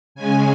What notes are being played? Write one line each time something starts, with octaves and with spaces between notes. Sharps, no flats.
C#3 G#3 C#4 G#5